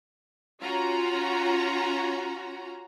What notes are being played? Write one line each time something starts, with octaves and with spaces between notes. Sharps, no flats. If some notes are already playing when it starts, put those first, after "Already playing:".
C#4 F4 F#4 A#5